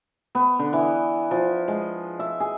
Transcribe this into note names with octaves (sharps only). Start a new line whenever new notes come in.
B3
D3
E3
F3
G#3
E5
G#4